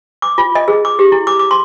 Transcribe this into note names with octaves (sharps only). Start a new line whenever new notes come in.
D6
F4
D#5
G#4
D6
G4
E4
D6
D6
C6